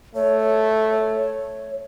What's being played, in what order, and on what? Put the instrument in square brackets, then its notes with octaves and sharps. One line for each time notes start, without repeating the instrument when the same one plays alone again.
[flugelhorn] A3 [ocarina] C#5